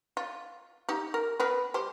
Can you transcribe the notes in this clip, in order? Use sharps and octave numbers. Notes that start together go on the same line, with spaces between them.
F4
D#4 G4
A#4
B3 A#4 B4
G3 G4 C5